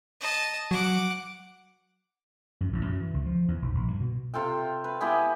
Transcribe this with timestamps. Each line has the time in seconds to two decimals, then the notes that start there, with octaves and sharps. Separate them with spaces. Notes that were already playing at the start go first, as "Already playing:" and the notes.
0.20 D#5 A5
0.71 F#3 F#5 D6
2.61 F#2
2.73 A1
2.87 F#2
3.00 E3
3.14 C#2
3.25 F3
3.48 E2
3.62 B1
3.74 A#1
3.88 G2
4.00 B2
4.34 C3 F4 A4 G5
4.84 B4
5.01 B3 E4 G4 G#4